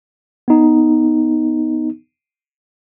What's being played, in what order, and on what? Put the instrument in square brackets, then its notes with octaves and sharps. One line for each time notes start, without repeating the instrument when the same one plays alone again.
[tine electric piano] B3 D#4